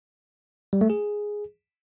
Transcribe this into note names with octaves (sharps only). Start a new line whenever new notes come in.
G3
A3
G#4